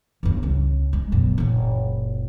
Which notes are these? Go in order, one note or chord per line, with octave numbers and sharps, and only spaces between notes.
G1 G2
C#2 C#4
G#3
F#2 B2
F#1 A#2